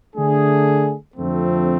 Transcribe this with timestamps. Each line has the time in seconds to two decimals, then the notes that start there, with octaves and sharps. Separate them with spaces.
0.15 D3 A3 D4 G#4
1.15 F2 D3 F3 A3 C4